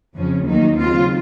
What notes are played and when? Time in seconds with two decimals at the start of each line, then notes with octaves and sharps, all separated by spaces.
0.16 F2 C#3 F3 C#4
0.46 D#2 D#3 F#3 A#3 D#4
0.77 D#2 C#3 F#3 C4 F4